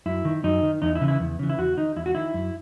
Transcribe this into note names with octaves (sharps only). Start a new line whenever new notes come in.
F#2 E4
D#3
F#2 D#4
D#3
E2 D#4
E4
C#3 E3
E4
E2
C#3 E3
E4
E2 F#4
D#3 D#4
E2 E4
F#4
D#3 E4
F#2